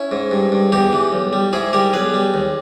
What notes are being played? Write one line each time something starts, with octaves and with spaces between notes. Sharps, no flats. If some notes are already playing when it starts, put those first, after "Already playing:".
Already playing: C#4 E4
G#2
G2
G2
E2 D#4 G4
E3
B1
G3
G#2 E4 G#4
G3 G4 A#4
B1 G#4 B4
G3
D#2